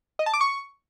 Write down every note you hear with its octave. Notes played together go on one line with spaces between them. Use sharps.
D#5
A5
D6
C#6